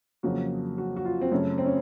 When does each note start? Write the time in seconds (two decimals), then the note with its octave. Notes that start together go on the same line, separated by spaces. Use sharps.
0.23 F2 C#3 F#3 A#3 F#4
0.78 F#4
0.96 F#4
1.05 F4
1.21 C4
1.32 F#2 C#3 A3 C#4
1.58 C4
1.66 C#4